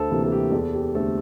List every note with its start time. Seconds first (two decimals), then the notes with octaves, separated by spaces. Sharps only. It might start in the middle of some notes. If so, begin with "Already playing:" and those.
Already playing: D2 A4 C5
0.10 C3 E3 A#3
0.23 A4
0.32 G4
0.52 E2 A4
0.73 G4
0.94 D3 A3 C4 A4